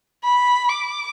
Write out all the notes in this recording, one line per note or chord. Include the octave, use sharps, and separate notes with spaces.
B5
D6